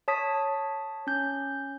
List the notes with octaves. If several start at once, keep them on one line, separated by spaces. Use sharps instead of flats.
C#5 A5 D#6 B6
C#4 G6